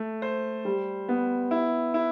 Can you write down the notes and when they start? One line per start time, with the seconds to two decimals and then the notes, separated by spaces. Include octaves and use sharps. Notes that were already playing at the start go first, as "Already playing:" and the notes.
Already playing: A3
0.22 C5
0.65 G3
1.09 B3
1.51 E4
1.94 E4